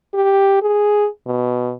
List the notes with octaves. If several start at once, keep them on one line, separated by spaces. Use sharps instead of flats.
G4
G#4
B2